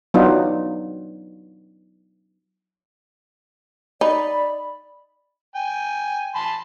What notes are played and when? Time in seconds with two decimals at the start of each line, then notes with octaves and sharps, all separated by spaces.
0.14 F#3 B3 D4 D#4 F4
4.01 D#4 D5 B5
5.56 G5 G#5
6.35 A5 B5 C6